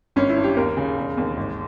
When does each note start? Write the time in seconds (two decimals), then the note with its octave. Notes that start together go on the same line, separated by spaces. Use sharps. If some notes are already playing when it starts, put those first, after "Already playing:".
0.16 G#1 C#4
0.30 E4
0.37 G2
0.44 G4
0.57 D#2 A#4
0.77 C#3
0.97 E1
1.17 D#2
1.37 G#1